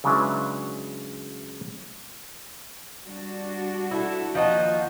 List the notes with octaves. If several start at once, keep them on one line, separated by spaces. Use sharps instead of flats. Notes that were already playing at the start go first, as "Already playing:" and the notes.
C#3 F#3 G#3 D4 E4 B4
G3 D4 F#4
A3 E4
D#2 F3 D#4 F4 F#4